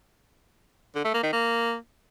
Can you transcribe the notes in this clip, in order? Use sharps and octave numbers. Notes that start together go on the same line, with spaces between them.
D3
A3
A#3
D#3
A#3